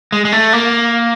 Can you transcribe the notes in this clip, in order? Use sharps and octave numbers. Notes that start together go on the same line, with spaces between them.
G#3
G#3
A3
A#3